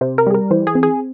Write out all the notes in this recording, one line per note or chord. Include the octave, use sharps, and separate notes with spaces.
C3 C5
A#4
G3 G#4
A#4
E3 C5
G#4
C4
G#4